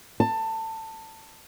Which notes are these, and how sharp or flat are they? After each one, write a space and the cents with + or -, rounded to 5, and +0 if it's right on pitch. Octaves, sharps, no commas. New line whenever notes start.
A5 +20